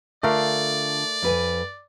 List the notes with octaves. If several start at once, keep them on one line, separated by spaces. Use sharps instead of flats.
D3 A3 F4 A#4 D5 F5
F2 B4 G#5